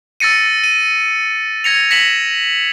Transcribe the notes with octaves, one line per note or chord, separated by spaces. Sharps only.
E6 A6 A#6 C#7 D#7
D#7
G#6 A#6 C#7 F7
A#6 B6 C#7 E7 F#7